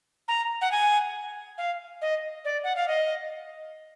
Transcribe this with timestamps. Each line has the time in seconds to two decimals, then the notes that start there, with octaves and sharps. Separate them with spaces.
0.28 A#5
0.61 F#5
0.71 G#5
1.58 F5
2.02 D#5
2.45 D5
2.64 F#5
2.76 F5
2.88 D#5